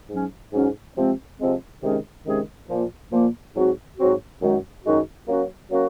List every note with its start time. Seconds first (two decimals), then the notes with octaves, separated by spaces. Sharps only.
0.10 G#2 F#3 C#4
0.53 G#2 F#3 C#4
0.97 C3 F3 G#3 C4
1.40 C3 F3 G#3 C4
1.82 C3 D#3 G#3 C#4 G#4
2.26 C3 D#3 G#3 C#4 G#4
2.69 A#2 F3 A#3
3.12 A#2 F3 A#3
3.56 G#2 F#3 C4 F#4
3.98 G#2 F#3 C4 F#4
4.41 F#2 D#3 G#3 D#4 F#4
4.84 F#2 D#3 G#3 D#4 F#4
5.28 F#3 A#3 C#4 F#4
5.71 F#3 A#3 C#4 F#4